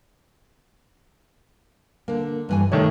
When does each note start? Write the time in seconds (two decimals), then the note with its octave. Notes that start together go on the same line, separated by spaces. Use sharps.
2.08 D3 A#3
2.49 G2 E3 G#5
2.72 D#3 A3 C#5 D5